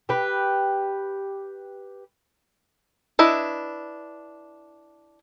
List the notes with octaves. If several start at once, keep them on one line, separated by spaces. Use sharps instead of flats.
G4 B4
D4 E4 B4 D#5